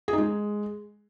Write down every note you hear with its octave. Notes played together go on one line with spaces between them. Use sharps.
G#4
D#4
G#3